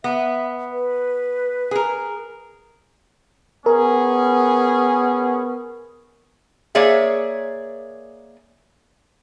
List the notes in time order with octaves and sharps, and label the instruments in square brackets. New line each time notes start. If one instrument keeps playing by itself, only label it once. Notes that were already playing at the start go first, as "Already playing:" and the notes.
[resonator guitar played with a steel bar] B3 [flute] E5
[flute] B4
[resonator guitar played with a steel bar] G#4 A#4
[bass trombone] B3 [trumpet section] C#4 G#4 [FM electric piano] A#4
[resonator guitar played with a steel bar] A#3 G#4 C#5 D5 E5